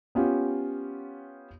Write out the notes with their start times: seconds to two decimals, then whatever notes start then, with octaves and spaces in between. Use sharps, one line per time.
0.15 B3 C#4 F4 G4